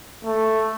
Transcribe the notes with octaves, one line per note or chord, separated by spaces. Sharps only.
A3